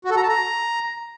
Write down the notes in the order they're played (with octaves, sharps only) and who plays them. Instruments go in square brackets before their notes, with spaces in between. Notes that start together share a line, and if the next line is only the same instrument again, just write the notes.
[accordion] F#4
A4
A#5
A5
A#5